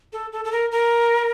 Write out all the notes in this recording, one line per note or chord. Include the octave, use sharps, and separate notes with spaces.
A4
A4
A4
A#4
A#4